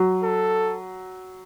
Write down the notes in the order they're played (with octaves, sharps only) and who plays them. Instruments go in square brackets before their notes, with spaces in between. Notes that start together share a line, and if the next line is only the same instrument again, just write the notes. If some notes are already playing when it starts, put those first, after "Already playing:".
Already playing: [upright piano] F#3
[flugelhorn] A4